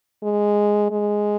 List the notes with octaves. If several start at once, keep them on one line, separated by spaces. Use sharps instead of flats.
G#3
G#3